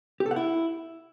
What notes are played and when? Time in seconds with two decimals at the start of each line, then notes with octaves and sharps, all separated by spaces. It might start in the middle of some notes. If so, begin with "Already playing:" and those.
0.20 G4
0.26 A4
0.31 F#5
0.36 E4